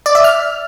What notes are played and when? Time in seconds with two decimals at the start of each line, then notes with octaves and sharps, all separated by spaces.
0.06 D5
0.15 E5
0.24 F6